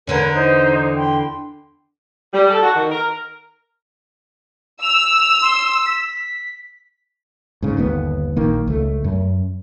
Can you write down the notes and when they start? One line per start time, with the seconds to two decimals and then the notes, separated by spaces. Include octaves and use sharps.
0.07 E2 D3 E3 A#4 B4 C#5
0.33 D#4 C5
0.97 G5 B5 C6
2.33 G3
2.49 A4
2.63 F#4
2.75 D#3
2.90 A#4
4.82 E6 F7
5.42 C6
5.86 B6
7.62 G#2 C#3
7.77 G1 D#2 D3 B3
8.36 A#1 D#3 A#3
8.67 C#2 A3
9.04 F#2